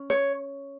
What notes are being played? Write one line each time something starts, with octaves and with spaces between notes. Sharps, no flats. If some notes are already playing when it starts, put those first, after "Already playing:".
Already playing: C#4
C#5